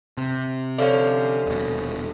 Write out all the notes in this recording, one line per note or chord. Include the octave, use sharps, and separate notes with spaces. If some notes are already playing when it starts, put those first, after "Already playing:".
C3
D3 F3 C#4
D#1 B2